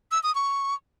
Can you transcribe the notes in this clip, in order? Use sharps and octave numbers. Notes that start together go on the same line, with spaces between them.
E6
D#6
C#6